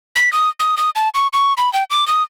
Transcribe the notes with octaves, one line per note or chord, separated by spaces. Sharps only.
B6
D#6
D#6
D#6
A5
C#6
C#6
B5
G5
D6
D#6